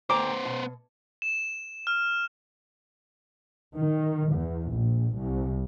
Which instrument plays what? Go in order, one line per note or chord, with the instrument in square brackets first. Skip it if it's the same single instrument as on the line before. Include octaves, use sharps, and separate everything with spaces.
[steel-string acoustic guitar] D2 G5 A#5 [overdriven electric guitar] B3 C5 [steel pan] D6
[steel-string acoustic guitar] B2
[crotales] E7
F6
[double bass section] D#3
E2
A#1
C2